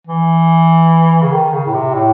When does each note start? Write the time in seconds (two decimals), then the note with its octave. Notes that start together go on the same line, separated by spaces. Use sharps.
0.07 E3
1.22 C#3
1.32 D#3
1.53 C#3
1.66 A2
1.74 C3
1.94 A2